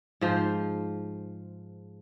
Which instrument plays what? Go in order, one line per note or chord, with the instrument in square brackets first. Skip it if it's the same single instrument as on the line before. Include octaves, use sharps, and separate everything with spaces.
[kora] G#2 F3 C5